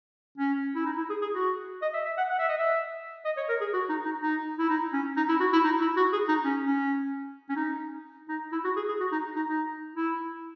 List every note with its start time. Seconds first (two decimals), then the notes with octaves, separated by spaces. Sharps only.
0.38 C#4
0.75 E4
0.86 D#4
0.97 E4
1.10 G#4
1.22 G#4
1.34 F#4
1.82 D#5
1.94 E5
2.05 E5
2.17 F#5
2.29 F#5
2.39 E5
2.49 D#5
2.58 E5
3.25 D#5
3.37 C#5
3.49 A#4
3.61 G#4
3.73 F#4
3.89 D#4
4.05 D#4
4.21 D#4
4.59 E4
4.69 D#4
4.93 C#4
5.17 D#4
5.29 E4
5.40 F#4
5.53 E4
5.64 D#4
5.81 E4
5.97 F#4
6.13 G#4
6.28 D#4
6.44 C#4
6.64 C#4
7.49 C#4
7.56 D#4
8.28 D#4
8.52 E4
8.64 F#4
8.76 G#4
8.88 G#4
9.00 F#4
9.12 D#4
9.36 D#4
9.48 D#4
9.96 E4